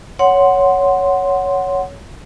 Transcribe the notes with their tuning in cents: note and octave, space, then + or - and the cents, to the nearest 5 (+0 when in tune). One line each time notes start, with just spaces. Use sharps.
C#5 +5 F#5 +0 C6 +0